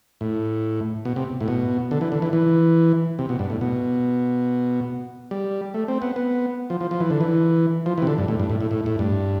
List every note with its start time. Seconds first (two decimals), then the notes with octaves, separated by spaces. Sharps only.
0.21 A2
1.05 B2
1.16 C3
1.40 A2
1.48 B2
1.91 D3
2.01 E3
2.12 D3
2.22 E3
2.33 E3
3.19 C3
3.29 B2
3.39 G2
3.50 A2
3.61 B2
5.31 G3
5.74 A3
5.88 C4
6.02 B3
6.16 B3
6.70 F3
6.81 F3
6.91 F3
7.00 E3
7.10 D3
7.21 E3
7.86 F3
7.98 E3
8.02 C3
8.07 D3
8.18 G2
8.28 A2
8.40 G2
8.50 A2
8.61 A2
8.71 A2
8.86 A2
8.99 G2